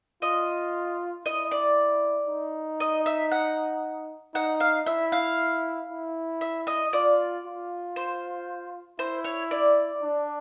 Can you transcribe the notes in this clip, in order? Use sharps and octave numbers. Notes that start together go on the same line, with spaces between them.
F4 D#5
E4 D#5
D5
D#4
D#5
E5
F#5
D#4 F#5
F5
E4 E5
F5
E4
E5
D#5
F4 D5
F4
C5
E4 C5
C#5
D5
D4